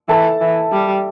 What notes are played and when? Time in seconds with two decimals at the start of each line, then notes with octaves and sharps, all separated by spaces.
0.09 E3 A4 A5
0.41 E3
0.72 G3